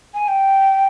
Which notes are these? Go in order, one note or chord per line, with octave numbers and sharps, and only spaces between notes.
G#5
G5